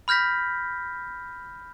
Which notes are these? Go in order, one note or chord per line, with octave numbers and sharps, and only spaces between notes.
B5 F6 G6 A#6 B6